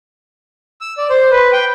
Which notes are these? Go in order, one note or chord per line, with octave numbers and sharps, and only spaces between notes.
E6
D5
C5
B4
G5